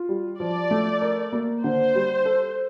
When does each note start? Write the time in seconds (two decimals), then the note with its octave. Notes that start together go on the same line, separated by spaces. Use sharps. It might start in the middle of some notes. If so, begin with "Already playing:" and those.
Already playing: F4
0.09 G3
0.39 F3 D5
0.71 A3
1.02 A#4
1.33 A#3
1.63 D3 C5
1.95 G3
2.25 A4